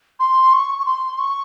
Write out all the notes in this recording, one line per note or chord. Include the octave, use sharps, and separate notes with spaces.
C6
C#6
C#6
C6
C#6